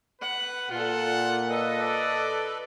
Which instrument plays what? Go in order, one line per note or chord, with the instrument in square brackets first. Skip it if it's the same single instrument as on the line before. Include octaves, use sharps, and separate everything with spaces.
[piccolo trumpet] B4 [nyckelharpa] F#5
[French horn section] A#2 [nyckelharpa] F4 A4 [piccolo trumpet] F#5
[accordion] A4 B4 [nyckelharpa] D#5
[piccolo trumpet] D5